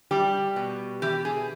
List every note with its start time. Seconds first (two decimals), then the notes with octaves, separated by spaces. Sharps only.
0.11 G3 G4
0.56 B2
1.02 E3 G4
1.25 G#4